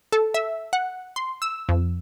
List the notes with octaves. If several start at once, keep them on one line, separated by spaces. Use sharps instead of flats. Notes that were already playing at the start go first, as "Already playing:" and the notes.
A4
E5
F#5
C6
E6
F2